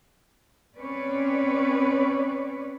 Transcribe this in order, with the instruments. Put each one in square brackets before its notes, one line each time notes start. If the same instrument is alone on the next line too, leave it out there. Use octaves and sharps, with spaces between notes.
[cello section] C4 C#4 B4 C#5 D5